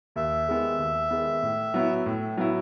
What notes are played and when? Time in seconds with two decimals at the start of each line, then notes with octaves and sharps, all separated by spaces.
0.16 D#2 E5
0.48 D#3 G#3 B3
0.79 D#2
1.11 D#3 G#3 B3
1.43 A2
1.74 F#3 B3 E4
2.06 A2
2.37 F#3 B3 E4